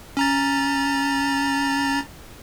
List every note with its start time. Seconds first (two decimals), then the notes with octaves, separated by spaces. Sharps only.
0.17 C#4 A#5 A6